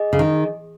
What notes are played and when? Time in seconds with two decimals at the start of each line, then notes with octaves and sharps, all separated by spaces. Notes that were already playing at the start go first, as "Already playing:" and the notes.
Already playing: G#4 D#5 G#5
0.13 C#3
0.19 D#3